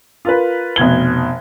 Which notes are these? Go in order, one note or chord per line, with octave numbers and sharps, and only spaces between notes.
F4 A#4 B4
F1 B2 G#6 G7